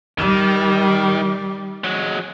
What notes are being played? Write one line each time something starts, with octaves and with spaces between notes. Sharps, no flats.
D#3 G3
F#3 G#3